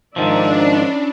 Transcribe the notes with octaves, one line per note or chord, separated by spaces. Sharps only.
G#2 D#3 F3 D4 D5 E5 A#5
C#4 E4